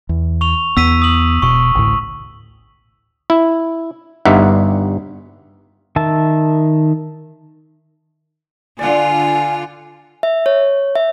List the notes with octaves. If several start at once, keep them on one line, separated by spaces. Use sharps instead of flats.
E2
C#6 F7
E2 B3 E6 B6 D#7
D#6 F#7
E1 B2 C#6
A1 D2 A2
E4
G1 G2 D#4 E5 F#5
D#3 E5 A5
D3 F4 D5 F#5 G#5
E5
C#5
E5